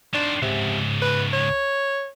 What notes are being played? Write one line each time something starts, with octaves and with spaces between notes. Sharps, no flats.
D#3 D4 C5
C#2 G#2 C3
B4
C#5